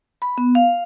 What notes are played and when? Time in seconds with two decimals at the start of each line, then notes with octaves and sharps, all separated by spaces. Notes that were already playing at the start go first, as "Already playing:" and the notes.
0.22 B5
0.38 B3
0.55 F5